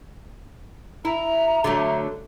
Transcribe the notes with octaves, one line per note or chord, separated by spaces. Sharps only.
E4 A#5
D3 F#3 A3